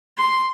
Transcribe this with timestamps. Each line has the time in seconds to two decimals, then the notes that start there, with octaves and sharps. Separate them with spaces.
0.17 C6